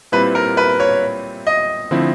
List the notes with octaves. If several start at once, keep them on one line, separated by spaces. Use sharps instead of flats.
A#2 G3 C4 E4 B4
A#4
B4
C#5
D#5
D3 F3 A3 C4 E4